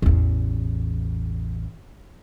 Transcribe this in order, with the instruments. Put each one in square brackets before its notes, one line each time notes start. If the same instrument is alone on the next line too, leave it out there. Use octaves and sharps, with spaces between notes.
[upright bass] A1 E2